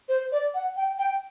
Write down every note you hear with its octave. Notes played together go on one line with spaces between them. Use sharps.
C5
D5
F#5
G5
G5